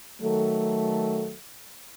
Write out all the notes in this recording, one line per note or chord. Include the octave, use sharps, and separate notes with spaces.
D#3 F#3 A3 A4